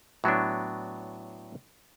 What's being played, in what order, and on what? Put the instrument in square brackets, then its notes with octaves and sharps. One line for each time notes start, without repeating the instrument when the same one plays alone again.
[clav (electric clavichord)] A2 F#3 B3 D4